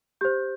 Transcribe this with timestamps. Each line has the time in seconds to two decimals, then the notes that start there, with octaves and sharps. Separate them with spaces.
0.21 G4 C5 G6